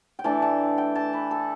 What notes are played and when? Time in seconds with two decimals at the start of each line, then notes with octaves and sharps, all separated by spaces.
0.19 G5
0.24 E3 A3 D4 A5
0.42 A5
0.78 G5
0.95 A5
1.13 B4
1.31 A4